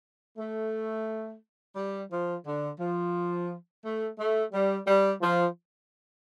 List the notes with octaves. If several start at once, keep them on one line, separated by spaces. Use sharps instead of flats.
A3
G3
F3
D3
F3
A3
A3
G3
G3
F3